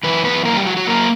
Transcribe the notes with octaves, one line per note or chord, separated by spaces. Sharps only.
F#2 E3 B4
B3 B4
A#3 A#4
G3 G4
F#3 F#4
F#3 F#4
F#3 A#3 A#4